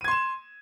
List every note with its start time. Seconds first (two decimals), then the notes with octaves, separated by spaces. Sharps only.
0.01 D#7
0.04 G#6
0.08 C6
0.11 E7